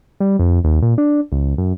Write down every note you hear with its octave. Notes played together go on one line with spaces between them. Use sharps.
G3
F2
D#2
A#2
D4
C#2
F#2